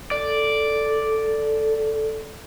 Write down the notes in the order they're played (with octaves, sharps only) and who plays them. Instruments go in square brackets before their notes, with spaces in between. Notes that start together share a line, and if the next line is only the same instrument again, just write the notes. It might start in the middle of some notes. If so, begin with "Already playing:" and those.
[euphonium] A4 [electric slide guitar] D5